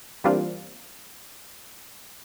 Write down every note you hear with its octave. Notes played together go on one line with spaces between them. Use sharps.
E3 G3 A#3 C4 D4 F4